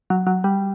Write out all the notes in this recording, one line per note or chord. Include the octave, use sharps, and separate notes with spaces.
F#3
F#3
G3